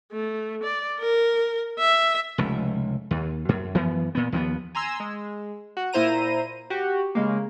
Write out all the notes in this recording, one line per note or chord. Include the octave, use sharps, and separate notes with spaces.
A3
D5
A#4
E5
F1 C#2
D#2
F#2
F#2 E3 F3 B3
A#2 B3
D#2 F3 A3 B3
G#5 A#5 C6 E6
G#3
F#4
A#2 E4 C5 A#5 D#7
F#4 G4
C#3 G#3 A#3